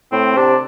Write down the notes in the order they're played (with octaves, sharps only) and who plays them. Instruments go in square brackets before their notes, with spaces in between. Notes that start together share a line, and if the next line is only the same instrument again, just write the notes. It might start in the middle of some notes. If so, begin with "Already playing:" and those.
[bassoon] A2 [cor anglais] C4
[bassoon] C3 [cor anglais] D4